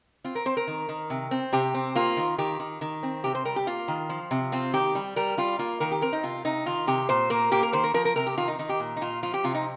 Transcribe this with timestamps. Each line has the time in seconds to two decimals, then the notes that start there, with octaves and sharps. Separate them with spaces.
0.24 C4 F4
0.35 A#4
0.45 C4 C5
0.57 A#4
0.67 D#3
0.89 D#3
1.10 C3
1.31 C4
1.53 C3 G4
1.74 C4
1.95 A#3 F4
2.17 D#3
2.38 D#3 G4
2.60 D#3
2.81 D#3
3.03 C4
3.24 C3 G4
3.35 C5
3.45 G3 A#4
3.56 G4
3.67 A#3 F4
3.88 D#3
4.09 F3
4.31 C3
4.52 C4 F4
4.74 D#3 G4
4.95 G3
5.16 G3 A#4
5.37 G3 F4
5.59 A#3 F4
5.80 D#3 A#4
5.91 G4
6.02 C4 A#4
6.13 D#4
6.23 C3 F4
6.45 C3 D#4
6.66 D#3 F4
6.87 C3 G4
7.09 A#2 C5
7.30 A#3 A#4
7.51 A#3 G4
7.63 A#4
7.73 D#3 C5
7.84 A#4
7.94 F3 A#4
8.05 A#4
8.16 C3 A#4
8.27 G4
8.38 D#3 F4
8.48 D#4
8.59 D#3 D#4
8.69 G4
8.80 A#2
8.97 D#4
9.01 A#2 F4
9.23 F3 F4
9.34 G4
9.44 C3 F4
9.55 D#4